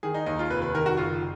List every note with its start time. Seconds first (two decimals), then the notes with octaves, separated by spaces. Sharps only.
0.03 D#3 G#4
0.14 D#4
0.26 D#2 D#4
0.39 F4
0.50 F1 B4
0.62 B4
0.74 D#3 A#4
0.86 F#4
0.97 F#1 F4